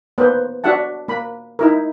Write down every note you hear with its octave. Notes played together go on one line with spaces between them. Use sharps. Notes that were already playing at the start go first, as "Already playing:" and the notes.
A#3 B3 B4 C5
D4 F#4 E5 F#5 A5
A#3 B5
D#4 E4 A#4